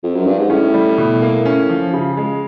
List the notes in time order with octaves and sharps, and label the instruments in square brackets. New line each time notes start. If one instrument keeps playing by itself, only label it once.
[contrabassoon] F2
F#2
G2
G#2
[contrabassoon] A2 [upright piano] C#4
[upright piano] G3
B2
A#3
C#4
F3
C#3
G#3